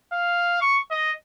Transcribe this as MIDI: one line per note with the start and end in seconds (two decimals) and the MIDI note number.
0.12 0.58 77
0.61 0.79 85
0.91 1.11 75